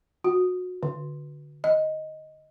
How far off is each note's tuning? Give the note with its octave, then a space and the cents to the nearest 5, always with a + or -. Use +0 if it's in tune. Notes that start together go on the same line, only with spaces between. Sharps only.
F#4 -25
D3 -5
D#5 +5